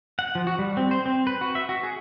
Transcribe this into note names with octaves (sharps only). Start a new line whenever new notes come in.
F#5
F3
F#4
G3
C4
C5
C4
B4
F#4
E5
F#4
G#4